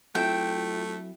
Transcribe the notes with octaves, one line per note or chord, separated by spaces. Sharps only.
F#3 A3 C4 E4 F4 G5